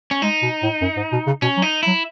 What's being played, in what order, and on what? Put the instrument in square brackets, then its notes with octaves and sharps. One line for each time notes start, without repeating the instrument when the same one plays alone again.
[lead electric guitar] C#4
[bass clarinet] G#3 [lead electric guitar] D#4
[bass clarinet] B2
A2
F#2
G#2
B2
C#3
[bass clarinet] B2 [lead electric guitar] C#4
[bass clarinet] F#3
[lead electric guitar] D#4
[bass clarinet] F#3 [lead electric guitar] E4